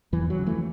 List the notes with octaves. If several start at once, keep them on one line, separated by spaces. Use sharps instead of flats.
E2 E3
F#3
C#3
E3 A3